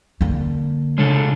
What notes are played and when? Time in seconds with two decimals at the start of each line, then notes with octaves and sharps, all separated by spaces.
0.21 D3 A#3
0.98 C#3 G#3 D4 A4